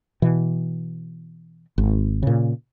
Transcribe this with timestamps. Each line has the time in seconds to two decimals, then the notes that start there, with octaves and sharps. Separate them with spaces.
0.22 B2 E3
1.78 G#1
2.23 A#2 C#3